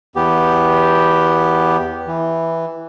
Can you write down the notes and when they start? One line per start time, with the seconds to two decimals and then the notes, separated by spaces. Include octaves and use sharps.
0.16 E2 B3 G4
2.07 E3